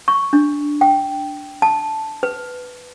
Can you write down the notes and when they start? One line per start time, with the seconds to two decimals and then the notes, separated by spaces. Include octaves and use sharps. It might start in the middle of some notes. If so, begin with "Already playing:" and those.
0.08 C#6
0.33 D4
0.81 G5
1.62 A5
2.23 B4